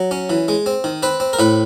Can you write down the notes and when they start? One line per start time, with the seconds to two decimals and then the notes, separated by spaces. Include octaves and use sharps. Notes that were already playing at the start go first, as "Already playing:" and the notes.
Already playing: F#3
0.11 C#4
0.30 E3
0.48 G#3
0.66 C4
0.84 D#3
1.03 C4 B4
1.20 C4
1.33 A#4
1.39 A2 B4